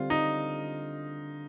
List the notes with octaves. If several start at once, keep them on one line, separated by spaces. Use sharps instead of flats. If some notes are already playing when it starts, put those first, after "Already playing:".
Already playing: D3 G3 C4 F4
D#4